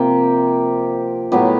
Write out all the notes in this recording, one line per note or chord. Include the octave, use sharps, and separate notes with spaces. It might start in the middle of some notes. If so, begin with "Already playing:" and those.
Already playing: C3 F3 A#3 G4
A2 F#3 B3 G4